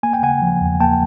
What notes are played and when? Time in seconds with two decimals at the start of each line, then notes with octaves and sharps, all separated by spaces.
0.03 A#3 G#5
0.13 G5
0.23 C#3 F#5 G#5
0.42 F3
0.61 E2
0.80 A#3 G5 A5